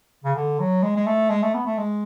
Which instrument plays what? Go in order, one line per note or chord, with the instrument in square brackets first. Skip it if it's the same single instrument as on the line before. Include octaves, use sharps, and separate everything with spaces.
[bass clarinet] C#3
D3
F#3
G#3
G#3
A3
G#3
A3
B3
A3
G#3